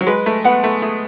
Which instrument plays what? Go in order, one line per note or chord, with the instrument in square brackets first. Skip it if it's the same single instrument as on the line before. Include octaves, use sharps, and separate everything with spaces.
[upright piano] F#3
[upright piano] G#3 [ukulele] B4
[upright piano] A3
[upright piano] B3 [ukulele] F#5 B5
[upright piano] A3
[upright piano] A3 [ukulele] G#4